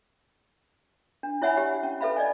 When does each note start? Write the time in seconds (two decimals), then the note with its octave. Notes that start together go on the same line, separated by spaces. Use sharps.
1.23 D4
1.42 E4 C#5 E5 F#5 G#5 B5
1.57 G4 C#5 E5 F#5
1.83 C#4
2.01 A4 B4 E5 F5 B5
2.17 D5 D#5 G#5